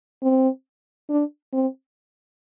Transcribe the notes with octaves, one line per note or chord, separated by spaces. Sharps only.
C4
D4
C4